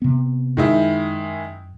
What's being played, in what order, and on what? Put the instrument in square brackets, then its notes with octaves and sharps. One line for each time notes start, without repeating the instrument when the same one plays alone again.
[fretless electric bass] C3 B3
[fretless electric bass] F#2 [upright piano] D#3 G#3 E4